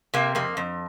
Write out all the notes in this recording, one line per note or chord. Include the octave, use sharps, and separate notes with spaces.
C3 A#3
F2 A#3
F2